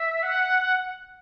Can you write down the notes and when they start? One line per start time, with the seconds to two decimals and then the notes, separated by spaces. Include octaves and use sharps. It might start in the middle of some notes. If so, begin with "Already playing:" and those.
Already playing: E5
0.23 F#5